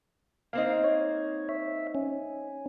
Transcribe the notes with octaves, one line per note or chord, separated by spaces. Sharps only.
A#3 C4 D#4 F5
C#5
E5
C#4